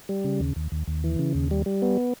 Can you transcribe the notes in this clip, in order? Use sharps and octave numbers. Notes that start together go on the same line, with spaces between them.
G3
C#3
D#2
D#2
D#2
D#2
E3
C#3
D#2
G3
G3
B3